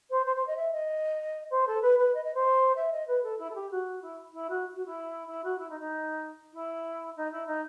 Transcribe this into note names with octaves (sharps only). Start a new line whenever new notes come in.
C5
C5
C5
D#5
E5
D#5
C5
A4
B4
B4
D#5
D#5
C5
E5
D#5
B4
A4
E4
A4
G4
F#4
E4
E4
F#4
F#4
E4
E4
F#4
E4
D#4
D#4
E4
D#4
E4
D#4